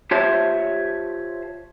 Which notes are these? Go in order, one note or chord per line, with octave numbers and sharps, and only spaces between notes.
F4 G4 C5 C#5 E5 A5